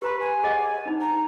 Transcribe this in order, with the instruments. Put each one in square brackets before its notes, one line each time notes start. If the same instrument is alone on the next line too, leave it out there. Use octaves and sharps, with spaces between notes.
[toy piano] G4 A#5 C6 [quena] B4
[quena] G#5
[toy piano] G#4 D#5 F#5
D4 D#4
[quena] A#5